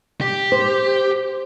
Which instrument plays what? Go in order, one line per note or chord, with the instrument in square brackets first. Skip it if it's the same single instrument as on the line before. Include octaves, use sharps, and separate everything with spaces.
[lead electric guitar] G4
[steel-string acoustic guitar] C5